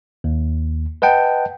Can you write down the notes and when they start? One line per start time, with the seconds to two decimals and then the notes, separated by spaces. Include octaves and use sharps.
0.24 D#2
1.02 B4 D#5 F#5 G5 A5